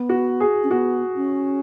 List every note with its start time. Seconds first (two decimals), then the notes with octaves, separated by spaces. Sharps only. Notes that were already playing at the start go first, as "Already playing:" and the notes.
Already playing: B3
0.09 F#4
0.40 G#4
0.64 C#4
0.71 B3 F#4
1.16 C#4